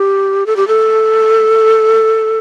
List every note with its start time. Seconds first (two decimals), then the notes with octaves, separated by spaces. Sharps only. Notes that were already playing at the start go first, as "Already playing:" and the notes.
Already playing: G4
0.46 A4
0.56 G4
0.68 A4